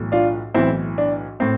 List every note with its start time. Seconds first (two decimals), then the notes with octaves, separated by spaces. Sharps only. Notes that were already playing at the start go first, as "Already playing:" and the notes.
Already playing: B1 A2 E3
0.12 D4 F4
0.54 B1 A2 E3 C4 E4
0.98 D4
1.40 A2 C4